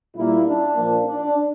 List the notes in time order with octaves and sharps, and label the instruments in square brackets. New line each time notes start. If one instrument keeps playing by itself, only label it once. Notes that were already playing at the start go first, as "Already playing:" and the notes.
[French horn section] A#2 G3 A#3 E4
D4
A#2 F3 A#3
D4